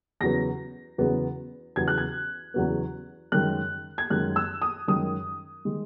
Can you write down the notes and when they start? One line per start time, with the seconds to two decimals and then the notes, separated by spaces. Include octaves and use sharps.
0.20 E2 C#3 F#3 B3 A#6
0.98 E2 C#3 F#3 B3
1.76 E2 C#3 F#3 B3 G#6
1.88 F#6
1.98 G#6
2.54 E2 C#3 F#3 B3
3.32 F#2 D#3 G#3 F#6
3.98 G#6
4.10 F#2 D#3 G#3 F#6
4.36 E6
4.62 D#6
4.88 F#2 D#3 G#3 D#6
5.65 D#3 G#3